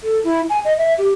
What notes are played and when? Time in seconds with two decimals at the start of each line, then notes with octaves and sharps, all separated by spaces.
0.04 A4
0.24 E4
0.50 G#5
0.65 D#5
0.78 E5
0.98 G4